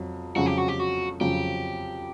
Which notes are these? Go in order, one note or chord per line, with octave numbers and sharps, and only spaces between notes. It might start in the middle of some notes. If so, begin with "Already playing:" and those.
Already playing: F2 F#3
F2 C#3 F#3 F#4
G4
F#4
G4
F#4
F2 C#3 F#3 G4